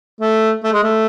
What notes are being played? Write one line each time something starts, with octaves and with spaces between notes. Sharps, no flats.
A3
A3
G#3
A3